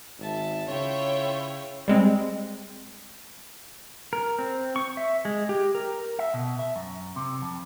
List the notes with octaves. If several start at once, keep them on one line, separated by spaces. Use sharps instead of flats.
G#1 E5 A5
C#3 E4 F4 C#5 E5 G5
G3 G#3 C4
A#4
C4
C#6
E5
G#3
G4
A#4
E5
B2
E5
F#2
C3
F2